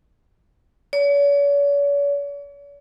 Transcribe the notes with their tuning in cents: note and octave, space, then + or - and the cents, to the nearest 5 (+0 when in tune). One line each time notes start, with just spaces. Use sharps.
C#5 +45